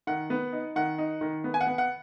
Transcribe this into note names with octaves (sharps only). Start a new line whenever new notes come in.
D#3 F#5
B3
D#4
D#3 F#5
D#4
D#3
B3
G#5
F#5
B3
F#5